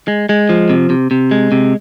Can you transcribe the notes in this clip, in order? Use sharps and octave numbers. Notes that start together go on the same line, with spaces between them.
G#3
G#3
F3
C3
C3
C3
G#3
C3